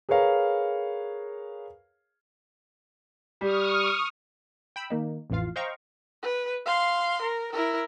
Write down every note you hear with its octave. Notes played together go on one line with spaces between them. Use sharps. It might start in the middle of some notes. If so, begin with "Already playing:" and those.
G#4 A#4 B4 C#5 F5 A#5
G3 C#6 D#6 F6
G5 B5 E6
D#3 A#3 D#4
A1 F2 A2 E3 F4 F5
C5 D#5 F5 G5 A#5 C#6
B4
F5 C6
A#4
E4 A#4